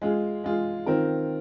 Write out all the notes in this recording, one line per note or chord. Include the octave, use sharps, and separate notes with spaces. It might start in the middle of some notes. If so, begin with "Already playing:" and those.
G#3 F4 G#4
G#3 F4 G#4
D#3 C4 F4 A#4